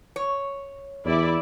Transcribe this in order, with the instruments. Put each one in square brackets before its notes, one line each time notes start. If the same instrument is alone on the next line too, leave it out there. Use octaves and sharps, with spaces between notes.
[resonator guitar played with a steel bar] C#5
[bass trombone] E2 [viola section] E4 D5